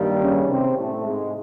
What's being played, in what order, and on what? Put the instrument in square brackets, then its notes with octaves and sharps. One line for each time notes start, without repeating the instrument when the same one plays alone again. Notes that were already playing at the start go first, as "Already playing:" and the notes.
Already playing: [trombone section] G2 D#3 G3 A#3
[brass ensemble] C#3 C#4
C3 C4
A2 A3
G#2 G#3